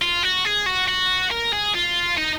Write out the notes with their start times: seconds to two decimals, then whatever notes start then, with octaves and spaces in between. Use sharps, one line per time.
0.02 F4
0.23 F#4
0.45 G#4
0.66 F#4
0.87 F#4
1.31 A#4
1.53 G#4
1.75 F4
2.18 D#4